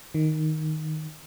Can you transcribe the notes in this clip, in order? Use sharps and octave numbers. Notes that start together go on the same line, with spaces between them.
D#3